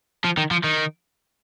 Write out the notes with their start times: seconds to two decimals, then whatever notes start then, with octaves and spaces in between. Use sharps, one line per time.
0.24 F3
0.37 D#3
0.51 F3
0.64 D#3